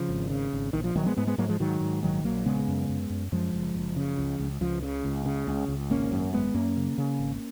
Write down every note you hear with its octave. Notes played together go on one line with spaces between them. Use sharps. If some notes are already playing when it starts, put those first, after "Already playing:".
Already playing: C#3 F3
G#1
C#3
G#1
A#1 D#3
F3
A#1 D#3 F#3
G#3 B3
G#2 G#3 B3
G#3 B3
G#2 F#3 A#3
F3 G#3
G#2 D#3 F#3
G#2
A#1 D#3 F#3
A#1 F#3 A#3
C#3 G#3 B3
F#2
F#2
F#2
F#2 F3 G#3
F#1
F#1
C#3
C#2
C#2
C#2 F3
C#3
C#2
C#3
C#2
C#2
G#1 A#3 C#4
F#2
G#1 G#3 B3
F#2 A#3 C#4
C#3
C#3
G#1